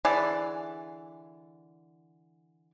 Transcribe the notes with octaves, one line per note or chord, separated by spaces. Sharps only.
D3 E3 G#4 D5